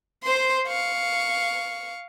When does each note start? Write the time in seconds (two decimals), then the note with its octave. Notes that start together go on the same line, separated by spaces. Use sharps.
0.23 C5 C6
0.67 F5 C#6